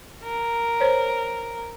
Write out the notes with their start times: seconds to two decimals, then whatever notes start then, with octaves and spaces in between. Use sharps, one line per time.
0.24 A#4
0.80 C5 C#5